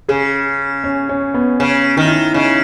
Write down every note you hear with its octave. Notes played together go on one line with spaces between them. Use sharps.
C#3 G#4
C#4
C#4
B3
C#3 C#4
D#3 D#4
E4
D#4
C#3 D#4